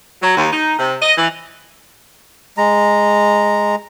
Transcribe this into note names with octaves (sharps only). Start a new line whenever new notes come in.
F#3
D#2
D#4
C3
D#5
E3
G#3 A#5